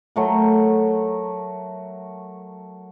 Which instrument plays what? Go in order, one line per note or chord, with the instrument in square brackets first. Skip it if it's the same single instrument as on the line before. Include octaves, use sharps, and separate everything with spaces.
[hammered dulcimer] F#3 A3 A#4